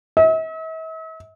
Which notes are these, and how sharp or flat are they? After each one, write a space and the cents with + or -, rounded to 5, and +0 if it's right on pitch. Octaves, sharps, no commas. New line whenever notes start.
E5 -45